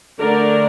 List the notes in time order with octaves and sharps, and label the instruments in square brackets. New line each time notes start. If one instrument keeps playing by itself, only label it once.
[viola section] D3 A3 D4 A#4 D5